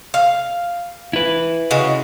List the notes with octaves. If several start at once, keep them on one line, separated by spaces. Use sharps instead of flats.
F5
E4 B4
C#3 G#3 F#4